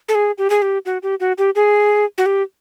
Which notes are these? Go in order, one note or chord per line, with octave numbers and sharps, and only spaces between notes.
A4
G#4
G4
G#4
G4
F#4
G4
F#4
G4
G#4
F#4
G4